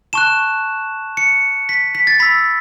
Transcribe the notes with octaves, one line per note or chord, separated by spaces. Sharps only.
A5 C#6 F#6 E7
C#7
B6
B6
A6
B5 E6 B6